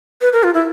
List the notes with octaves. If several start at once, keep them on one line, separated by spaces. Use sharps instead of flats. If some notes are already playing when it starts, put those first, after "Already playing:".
B4
A#4
F4
E4